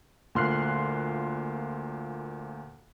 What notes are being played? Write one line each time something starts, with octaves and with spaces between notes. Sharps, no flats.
D2 A#2 C6 F6 F#6 C7